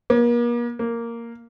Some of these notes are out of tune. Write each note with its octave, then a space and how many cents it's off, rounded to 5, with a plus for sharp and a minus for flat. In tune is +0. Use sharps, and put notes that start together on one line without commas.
A#3 +40
A#3 -5